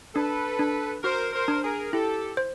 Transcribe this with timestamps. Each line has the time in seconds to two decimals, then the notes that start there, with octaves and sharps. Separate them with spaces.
0.15 D4 A4 B4
0.59 D4
1.04 F#4 A#4 C5
1.33 A#4 C5
1.48 D4
1.63 G#4 A#4
1.92 E4 G4 A4
2.37 C5